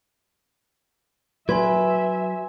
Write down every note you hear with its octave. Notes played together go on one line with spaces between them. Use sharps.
F#3 B4 E5 G#5 C6 G#6